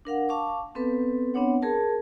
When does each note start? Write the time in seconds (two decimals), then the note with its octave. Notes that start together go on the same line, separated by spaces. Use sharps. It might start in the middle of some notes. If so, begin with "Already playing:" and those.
0.05 D4 A#4 F5 F#5
0.29 F5 A5 C#6 D6
0.75 B3 C4 A4 B4
1.34 B3 C4 D4 C#5 F#5
1.62 G#4 A#4 A5